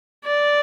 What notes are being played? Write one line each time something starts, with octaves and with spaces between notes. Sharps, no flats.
D5